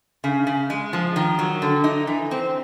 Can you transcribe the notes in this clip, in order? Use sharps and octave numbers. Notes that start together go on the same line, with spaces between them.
C#3
C#3
G#3
F3
D#3
F#3
D3
D#4
E3
C4